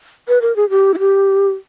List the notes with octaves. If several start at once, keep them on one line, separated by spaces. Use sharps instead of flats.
B4
A#4
G#4
G4
E4
G4